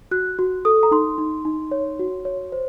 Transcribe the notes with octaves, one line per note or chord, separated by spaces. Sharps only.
F#4 F#6
F#4
A4 D#6
A#5
D#4 C6
D#4
D#4
C#5
F#4
C#5
C5